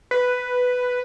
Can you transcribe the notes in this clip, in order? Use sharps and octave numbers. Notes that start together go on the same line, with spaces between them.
B4